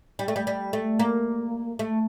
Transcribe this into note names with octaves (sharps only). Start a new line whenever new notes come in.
G3
A3
G3
G3
A3
A#3
A3